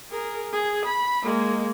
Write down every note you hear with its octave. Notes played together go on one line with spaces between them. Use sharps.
G#4 A#4
G#4
B5
G#3 A#3